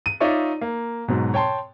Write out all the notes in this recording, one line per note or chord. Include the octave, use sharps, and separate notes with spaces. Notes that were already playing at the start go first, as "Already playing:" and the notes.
D#7
D#4 F4 C#5 D5 E5 C#6
A#3
G#2 B2 F#3
C#5 G5 A5 C6